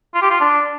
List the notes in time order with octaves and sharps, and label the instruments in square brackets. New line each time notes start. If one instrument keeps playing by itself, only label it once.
[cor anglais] F4
G4
F4
D4